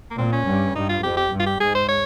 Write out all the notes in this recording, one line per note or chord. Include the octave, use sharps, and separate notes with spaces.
A#3
A#2 C4
C#4
G2
G2 D#4
F4
F2 G4
G4
G2
F4
G4
G#2 G#4
C5
C#5